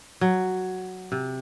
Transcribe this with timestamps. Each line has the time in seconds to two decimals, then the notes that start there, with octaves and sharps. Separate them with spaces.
0.21 F#3
1.12 C3